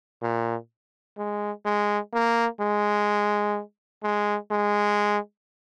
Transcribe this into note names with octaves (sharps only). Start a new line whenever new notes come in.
A#2
G#3
G#3
A#3
G#3
G#3
G#3